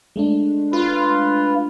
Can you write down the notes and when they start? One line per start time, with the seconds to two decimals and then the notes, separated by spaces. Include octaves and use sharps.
0.16 G#3 A3 D4
0.73 F4 B4